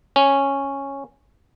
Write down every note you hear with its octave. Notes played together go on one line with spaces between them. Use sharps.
C#4